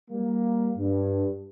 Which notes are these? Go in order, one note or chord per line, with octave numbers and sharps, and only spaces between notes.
G3 A#3
G2